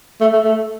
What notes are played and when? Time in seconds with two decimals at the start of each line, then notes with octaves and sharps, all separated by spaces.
0.21 A3
0.33 A3
0.45 A3